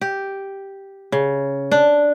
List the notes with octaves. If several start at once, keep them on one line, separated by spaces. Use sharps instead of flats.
G4
C#3
D4